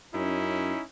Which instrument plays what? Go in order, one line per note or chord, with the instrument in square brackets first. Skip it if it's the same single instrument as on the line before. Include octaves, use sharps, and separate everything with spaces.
[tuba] F#2 [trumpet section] C#4 D#4 E4